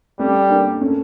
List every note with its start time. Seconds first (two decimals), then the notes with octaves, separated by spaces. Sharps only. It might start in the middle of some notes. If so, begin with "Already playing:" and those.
0.19 G3 A3 C#4
0.50 A#3 D4
0.81 A3 C#4